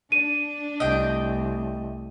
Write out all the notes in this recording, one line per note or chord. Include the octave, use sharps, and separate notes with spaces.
D4 D#7
C2 A3 D#5 G5